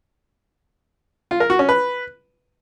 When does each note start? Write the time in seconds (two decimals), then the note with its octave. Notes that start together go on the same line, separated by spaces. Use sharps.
1.31 F4
1.40 A#4
1.50 F#4
1.59 C#4
1.69 B4